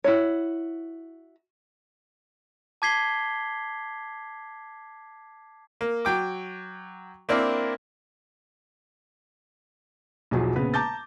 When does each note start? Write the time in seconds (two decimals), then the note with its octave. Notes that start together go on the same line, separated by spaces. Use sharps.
0.04 E4 F#4 C#5
2.82 A5 D6 G#6 B6 C7 G7
5.81 A#3
6.05 F#3 G5 D6
7.29 A#3 C4 D4 E4 A#4
10.31 B1 E2 F3 F#3
10.56 A#1 C#3 B3 B4
10.74 A5 A#5 D6 G6 A6